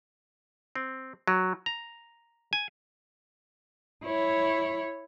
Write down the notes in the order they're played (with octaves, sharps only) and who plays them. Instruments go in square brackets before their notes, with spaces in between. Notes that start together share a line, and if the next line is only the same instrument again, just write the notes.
[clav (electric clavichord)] C4
F#3
A#5
G#5
[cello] E4 C#5